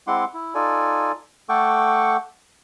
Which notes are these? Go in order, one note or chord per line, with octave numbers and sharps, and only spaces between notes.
G#3 C4 E4 F#5 C6 D6
E4
D#4 F4 A4 D5 G#5
A3 A4 F#5 G5 C#6 D6